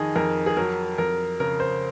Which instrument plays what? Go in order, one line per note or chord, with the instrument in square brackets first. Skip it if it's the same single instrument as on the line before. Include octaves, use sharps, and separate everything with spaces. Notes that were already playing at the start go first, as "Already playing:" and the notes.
Already playing: [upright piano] F2 D#3 G#4 D#5
F2 A#4
G#4
F#3 A#4
F2 A#4
C#3 A#4
C5